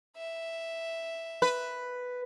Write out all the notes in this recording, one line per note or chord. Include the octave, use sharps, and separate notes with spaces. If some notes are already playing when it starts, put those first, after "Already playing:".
E5
B4